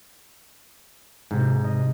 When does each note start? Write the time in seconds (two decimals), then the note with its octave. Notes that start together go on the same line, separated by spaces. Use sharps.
1.31 G#2 C3 G#3
1.64 D#5